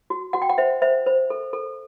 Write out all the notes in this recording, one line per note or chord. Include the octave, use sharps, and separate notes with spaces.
F#4
F#4 F#5
G5
F#5
C5 E5
C5 E5
C5
A4
A4